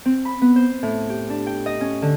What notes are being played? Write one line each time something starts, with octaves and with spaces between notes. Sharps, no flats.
C4
B5
B3
C5
A2
G4
D4
G5
D#5
C#4
D3